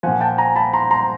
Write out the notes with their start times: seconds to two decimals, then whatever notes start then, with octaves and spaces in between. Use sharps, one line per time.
0.03 A#2 F3 F#5 G#5
0.21 G5 A5
0.38 G#5 A#5
0.56 A5 B5
0.73 A#5 C6
0.91 A#5 C6